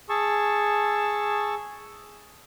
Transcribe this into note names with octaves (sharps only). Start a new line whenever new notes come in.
G#4 A5 C#6 E6